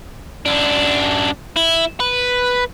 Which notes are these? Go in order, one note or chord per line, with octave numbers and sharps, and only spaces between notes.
F#2 D4
E4
B4